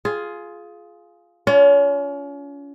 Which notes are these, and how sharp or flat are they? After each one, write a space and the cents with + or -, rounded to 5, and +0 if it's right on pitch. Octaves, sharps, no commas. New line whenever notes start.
F4 +0 G#4 +15
C#4 +35 F4 +0